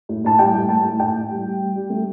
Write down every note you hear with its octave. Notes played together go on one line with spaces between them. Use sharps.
A2
A2 A5
G3 G5
A2
A2 A5
A2
A2 G5
A2
G3
G3
G3
G3
A3